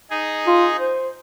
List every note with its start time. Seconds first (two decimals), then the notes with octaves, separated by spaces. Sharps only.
0.10 D#4 G#4
0.47 F4
0.77 C5